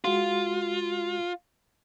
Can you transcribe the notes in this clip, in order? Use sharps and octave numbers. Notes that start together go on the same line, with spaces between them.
G#3 F4 F#4 C6